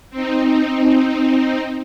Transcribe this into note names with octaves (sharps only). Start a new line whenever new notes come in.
C4 D#4